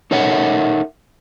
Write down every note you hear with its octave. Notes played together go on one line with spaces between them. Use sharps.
D#4 A4 A#4 C#5 E5 F#5